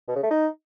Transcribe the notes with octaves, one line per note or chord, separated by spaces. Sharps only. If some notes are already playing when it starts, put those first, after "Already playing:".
B2
C#3
A3
D#4